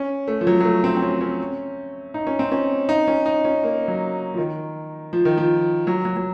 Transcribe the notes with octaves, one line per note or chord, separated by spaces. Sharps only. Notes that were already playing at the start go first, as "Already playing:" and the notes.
Already playing: C#4
A3
F3
F#3
F#3
A3
C4
C4
C#4
C#4
D#4
C#4
C4
C#4
D#4
C#4
D#4
C#4
A#3
F#3
F3
D#3
F3
D#3
F3
F#3
F#3
F#3